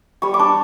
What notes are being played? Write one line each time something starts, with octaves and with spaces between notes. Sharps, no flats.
G3 C#6
D6
D4